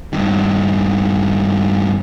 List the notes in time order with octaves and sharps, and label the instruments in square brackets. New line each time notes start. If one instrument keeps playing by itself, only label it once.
[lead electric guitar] G2 D#3